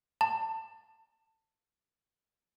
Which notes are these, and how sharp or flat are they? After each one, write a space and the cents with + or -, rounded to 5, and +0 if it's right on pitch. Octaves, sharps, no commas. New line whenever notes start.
A5 +20